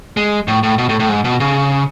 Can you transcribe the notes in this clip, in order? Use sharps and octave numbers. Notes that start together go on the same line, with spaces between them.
G#3
A2
A2
B2
A2
A2
G#2
B2
C#3